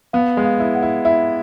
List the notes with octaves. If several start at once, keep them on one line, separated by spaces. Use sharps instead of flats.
B3 F5
G#3
F5
E4
F#5
E4
E4 E5